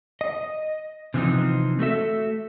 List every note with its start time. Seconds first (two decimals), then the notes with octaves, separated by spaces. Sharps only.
0.21 D#5
1.14 C3 E3 F3 G#3 C4 D#4
1.79 A3 F#4 A4 E5